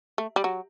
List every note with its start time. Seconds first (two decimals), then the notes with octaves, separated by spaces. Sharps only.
0.18 A3
0.36 G3
0.44 F#3